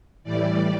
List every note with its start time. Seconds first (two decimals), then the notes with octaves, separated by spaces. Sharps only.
0.24 A2 E3 G3 D5